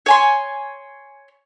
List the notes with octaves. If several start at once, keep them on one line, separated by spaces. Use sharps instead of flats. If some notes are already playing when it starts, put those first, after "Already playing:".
C#5 G#5 C6